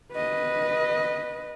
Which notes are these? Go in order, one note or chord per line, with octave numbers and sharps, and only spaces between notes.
B4 D#5